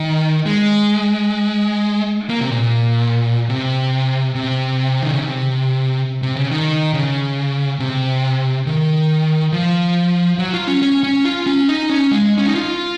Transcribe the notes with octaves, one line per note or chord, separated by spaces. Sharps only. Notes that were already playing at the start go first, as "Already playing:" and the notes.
Already playing: D#3
G#3
A#3
C3
A#2
C3
C3
D#3
C#3
C3
C3
C#3
D#3
C#3
C3
D#3
F3
F#3
F4
C#4
C#4
C#4
F4
C#4
D#4
C#4
G#3
C#4
D#4
F4